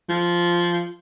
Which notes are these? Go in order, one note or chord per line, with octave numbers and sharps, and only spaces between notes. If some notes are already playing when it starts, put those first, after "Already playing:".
F3